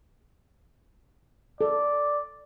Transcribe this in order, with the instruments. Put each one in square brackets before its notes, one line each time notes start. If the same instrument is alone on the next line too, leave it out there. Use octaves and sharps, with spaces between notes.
[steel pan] A4 [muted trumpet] D5